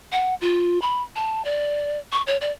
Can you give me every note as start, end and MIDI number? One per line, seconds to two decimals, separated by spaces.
0.12 0.34 78
0.41 0.81 65
0.82 1.02 83
1.16 1.45 81
1.45 1.99 74
2.12 2.22 85
2.27 2.37 73
2.41 2.51 74